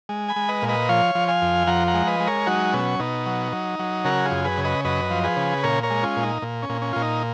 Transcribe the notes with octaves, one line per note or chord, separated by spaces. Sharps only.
G#3
G#5 B5
G#3
B4 D#5
A#2
B4 D#5
F3 C#5 F5
F3
F5 G#5
F2
F3 F#5 A#5
F#5 A#5
G#3
B4 D#5
G#3
A#4 C#5
F#3 D#4 F#4
B2 C#4
B2 D#4
F#3
F#3
F#3
C#3 F#4 A#4
F4 G#4
F#2
G#4 B4
C#3
B4 D#5
F#2 B4 D#5
F3
G#4 B4
C#3
A#2 A#4 C#5
A#4 C#5
G#3
C#4 F4
A#2
D#4
A#2
C#4
A#2
C#4
A#2 F4
D#4